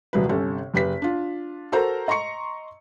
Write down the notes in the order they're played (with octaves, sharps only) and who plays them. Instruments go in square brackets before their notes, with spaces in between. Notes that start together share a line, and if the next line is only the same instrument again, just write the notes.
[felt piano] D#1 C2 F#3 B4
G1 C3 C#4 A4
F#1 G4 B4 B6
D4 F4
F#4 A4 A#4 C5 A#5
D#5 A#5 C6 C#6 C#7